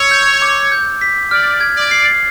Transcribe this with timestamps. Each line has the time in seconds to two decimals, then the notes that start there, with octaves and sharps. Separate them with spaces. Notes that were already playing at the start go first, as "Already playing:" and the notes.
Already playing: C#5 E6
0.11 G6
0.42 D6
0.72 G6
1.01 B6
1.31 D5 F6
1.60 G#6
1.76 D5
1.91 C7